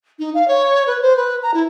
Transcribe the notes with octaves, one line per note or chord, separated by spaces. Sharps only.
D#4
F5
C#5
B4
C5
B4
A#5
E4